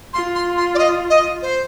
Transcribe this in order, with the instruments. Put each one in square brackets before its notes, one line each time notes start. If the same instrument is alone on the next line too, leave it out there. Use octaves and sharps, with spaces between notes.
[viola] F4 [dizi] C6
[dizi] C6
C6
D5
D#5
D#5
C5